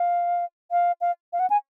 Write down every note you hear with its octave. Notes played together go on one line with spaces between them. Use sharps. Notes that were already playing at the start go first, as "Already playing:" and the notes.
Already playing: F5
F5
F5
F5
F#5
G#5